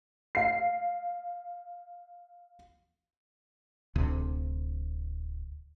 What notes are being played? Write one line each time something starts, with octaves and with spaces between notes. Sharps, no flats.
F5 C7
D1 D2 C3